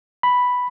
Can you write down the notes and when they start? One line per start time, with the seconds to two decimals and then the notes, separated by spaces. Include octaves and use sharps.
0.23 B5